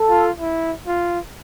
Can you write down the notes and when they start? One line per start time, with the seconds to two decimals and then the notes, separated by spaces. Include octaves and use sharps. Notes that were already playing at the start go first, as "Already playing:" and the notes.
Already playing: A4
0.10 F4
0.40 E4
0.87 F4